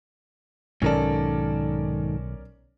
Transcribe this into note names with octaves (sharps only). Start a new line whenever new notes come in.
B1 G#2 D#3 C#4 A4 A#4 D5